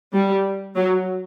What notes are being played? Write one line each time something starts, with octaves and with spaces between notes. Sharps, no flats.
G3
F#3